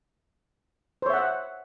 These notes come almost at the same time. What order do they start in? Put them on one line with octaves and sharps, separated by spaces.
C5 C#5 E5 F#5